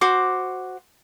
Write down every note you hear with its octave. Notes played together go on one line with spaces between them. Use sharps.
F#4 C5 D6